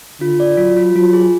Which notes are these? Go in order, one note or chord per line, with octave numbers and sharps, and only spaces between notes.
D3 F4
D5
F#3 F4
F4
F#3 F4
G#4